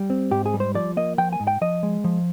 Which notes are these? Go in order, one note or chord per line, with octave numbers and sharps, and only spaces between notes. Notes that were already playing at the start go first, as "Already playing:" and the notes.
Already playing: G3
C4
G#2 G4
G#4
G3
C5
F3 D5
A#3 D#5
F3 G5
G#5
G#2
G5
F3 D#5
G#3
F3